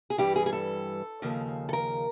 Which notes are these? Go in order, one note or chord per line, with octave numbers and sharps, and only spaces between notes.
G#4
G2 E3 G3 G4
G#4
G#4
A4
D#2 C#3 F3
A4
A#4